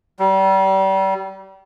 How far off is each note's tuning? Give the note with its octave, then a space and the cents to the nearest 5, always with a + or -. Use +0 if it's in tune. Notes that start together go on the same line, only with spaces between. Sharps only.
G3 -30